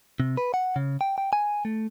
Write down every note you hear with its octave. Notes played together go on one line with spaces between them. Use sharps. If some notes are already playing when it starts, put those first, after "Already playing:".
C3
B4
F#5
C#3
G5
G5
G#5
A3